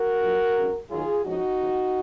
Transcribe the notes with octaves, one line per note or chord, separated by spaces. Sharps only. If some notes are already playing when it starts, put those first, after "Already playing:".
Already playing: F#4 A#4
A#1 A#2 F#3
G#1 F#2 C#3
D#2 D#3 F#3 F4 G#4
F2 F3 G#3 C#4 D#4 F#4
D#2 C#3 F3